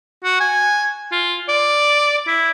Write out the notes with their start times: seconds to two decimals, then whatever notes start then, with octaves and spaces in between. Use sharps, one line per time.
0.24 F#4
0.40 G#5
1.12 F4
1.49 D5
2.27 E4